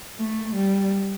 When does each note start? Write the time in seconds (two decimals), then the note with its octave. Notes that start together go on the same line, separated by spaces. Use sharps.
0.18 A3
0.54 G3